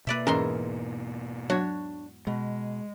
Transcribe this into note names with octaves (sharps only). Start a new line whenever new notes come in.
B2 A#3 B4 D5 E5
E2 G#2 C#4 G#4 A#4 E5 C6
F#3 D4 F#4 C#5
B2 G#3